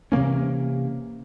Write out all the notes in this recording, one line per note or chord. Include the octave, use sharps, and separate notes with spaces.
C3 E3 A#3 C#4